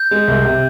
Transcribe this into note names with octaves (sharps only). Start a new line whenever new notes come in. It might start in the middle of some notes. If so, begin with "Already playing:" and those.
Already playing: G6
G#3
C2
C3